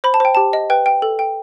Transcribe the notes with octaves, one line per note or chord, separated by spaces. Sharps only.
C5 B5
A5
C5 G5
G4 A5
D#5
B4 G5
G5
A4
G5